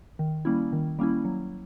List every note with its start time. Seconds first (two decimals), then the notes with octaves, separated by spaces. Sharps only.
0.19 D#3
0.45 G3 A#3 C#4 E4
0.72 D#3
0.99 G3 A#3 C#4 E4
1.25 F#3